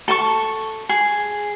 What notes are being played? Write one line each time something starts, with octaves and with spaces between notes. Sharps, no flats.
A4 A5 C#6
G#4